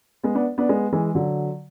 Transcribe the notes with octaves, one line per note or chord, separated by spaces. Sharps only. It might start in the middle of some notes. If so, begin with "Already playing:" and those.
G#3 B3
B3 D4
B3 D4
G#3 B3
E3 G#3
D3 F#3